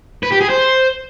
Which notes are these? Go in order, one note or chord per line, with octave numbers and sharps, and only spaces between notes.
B4
G4
G#4
C5